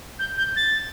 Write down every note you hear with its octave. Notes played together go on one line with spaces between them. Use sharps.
G6
G6
A6